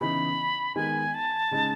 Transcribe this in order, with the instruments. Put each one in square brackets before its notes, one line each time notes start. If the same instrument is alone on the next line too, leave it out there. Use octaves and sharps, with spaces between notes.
[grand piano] C#3 E3 B3 D#4 [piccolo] B5
[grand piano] D#3 G#3 B3 [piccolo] G#5
[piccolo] A5
[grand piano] C#3 G#3 D#4